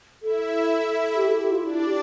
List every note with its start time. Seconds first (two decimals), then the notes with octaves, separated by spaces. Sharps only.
0.22 E4 A4 E5
1.17 G4
1.28 A4
1.40 G4
1.52 F4
1.63 D4 E4 D5
1.86 G4